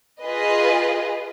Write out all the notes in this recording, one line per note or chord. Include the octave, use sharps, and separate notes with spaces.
F4 G#4 B4 D#5